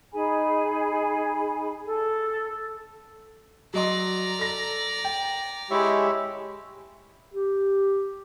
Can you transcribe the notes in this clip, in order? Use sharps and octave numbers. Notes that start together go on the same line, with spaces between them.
D#4 G#4 G#5 B5
A4
F#3 D5 D#5 A#5 C6
A4 A#6
G5
G#3 E4 G4 C#5 E5
G4